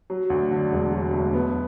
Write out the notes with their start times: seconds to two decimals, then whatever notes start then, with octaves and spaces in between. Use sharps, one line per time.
0.10 F#3
0.30 D2
0.51 D3
0.72 E1
0.93 F#3
1.13 D2
1.34 B3